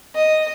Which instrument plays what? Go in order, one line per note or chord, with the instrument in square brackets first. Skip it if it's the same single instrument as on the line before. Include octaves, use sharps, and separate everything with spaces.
[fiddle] D#5